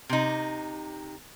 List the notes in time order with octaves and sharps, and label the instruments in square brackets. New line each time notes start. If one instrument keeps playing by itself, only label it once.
[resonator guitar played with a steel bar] C3 D#4